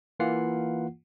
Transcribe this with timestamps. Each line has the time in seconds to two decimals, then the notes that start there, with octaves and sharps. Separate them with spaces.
0.20 E3 A#3 F4 F#5 C7